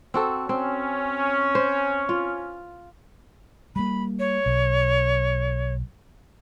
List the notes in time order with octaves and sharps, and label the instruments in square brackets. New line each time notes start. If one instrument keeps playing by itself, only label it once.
[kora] C4 F#4 A4
[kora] C4 [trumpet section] C#4
[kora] C5
F4
[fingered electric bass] G3 A#3 [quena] B5
[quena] C#5
[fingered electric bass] B1